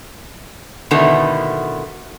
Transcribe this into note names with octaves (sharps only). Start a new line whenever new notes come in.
B2 D3 D#3 A3 B3 E4